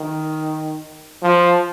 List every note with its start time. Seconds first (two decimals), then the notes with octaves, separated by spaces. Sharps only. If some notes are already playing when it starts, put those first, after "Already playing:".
Already playing: D#3
1.23 F3